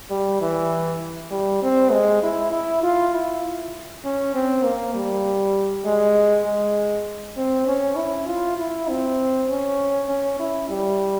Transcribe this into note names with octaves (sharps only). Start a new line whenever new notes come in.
G3
E3
G3
C4
G#3
E4
E4
F4
E4
C#4
C4
A#3
G3
G#3
G#3
C4
C#4
E4
F4
E4
C4
C#4
C#4
E4
G3